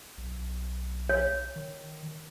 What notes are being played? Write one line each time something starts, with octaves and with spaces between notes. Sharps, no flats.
B1
C#5
D#3